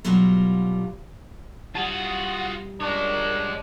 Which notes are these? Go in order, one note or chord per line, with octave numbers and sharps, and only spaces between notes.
B2 F#3 G3 F4
G3 F4 F#4 F#5 G#5 A5 D#6
G#3 D4 A#4 C#5